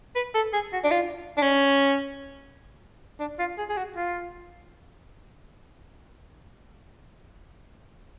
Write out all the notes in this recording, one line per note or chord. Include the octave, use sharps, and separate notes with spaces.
B4
A4
G#4
F#4
D4
F4
D4
C#4
D4
F4
G#4
G#4
F#4
F4